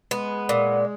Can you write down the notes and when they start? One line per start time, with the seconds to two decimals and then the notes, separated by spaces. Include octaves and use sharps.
0.11 G#3 B3
0.49 A#2